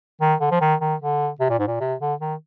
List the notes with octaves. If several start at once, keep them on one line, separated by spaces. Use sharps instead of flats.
D#3
D3
F3
D#3
D#3
D3
C3
A#2
G#2
A#2
C3
D3
D#3